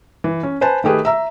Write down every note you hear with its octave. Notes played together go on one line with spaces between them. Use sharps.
E3
C#4
B4 C5 G#5 A5
D#3 A3 G4 G#4 B4
E5 A#5 E6